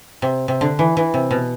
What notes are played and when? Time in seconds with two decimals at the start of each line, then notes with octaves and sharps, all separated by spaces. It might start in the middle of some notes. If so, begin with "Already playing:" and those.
0.22 C3
0.48 C3
0.61 D3
0.79 E3
0.97 E3
1.14 C3
1.31 B2